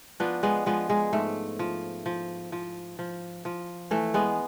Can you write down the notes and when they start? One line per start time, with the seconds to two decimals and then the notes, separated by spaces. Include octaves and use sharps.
0.20 F3 B3 D4
0.43 G#3 B3
0.66 F3 G#3 B3
0.89 G#3
1.13 G#2 A3
1.59 F3
2.06 F3
2.52 F3
2.99 F3
3.45 F3
3.91 E3 A3
4.14 G#3 B3